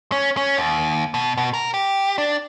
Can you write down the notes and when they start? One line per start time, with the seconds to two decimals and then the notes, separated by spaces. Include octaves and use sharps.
0.12 C#4
0.37 C#4
0.57 D#2
1.14 B2
1.37 B2
1.54 A#4
1.74 G4
2.18 D4